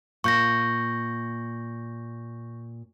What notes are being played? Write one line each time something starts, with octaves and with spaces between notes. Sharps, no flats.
A#2 C#6 G6 A#6